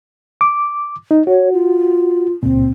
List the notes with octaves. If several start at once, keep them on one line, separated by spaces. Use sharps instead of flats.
D6
D#4
F#4 C#5
F4
C#2 A#2 C4